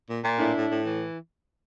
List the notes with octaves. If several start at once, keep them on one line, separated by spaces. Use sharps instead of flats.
A#2
A#2
A2 D4 E4
A2
A2
E3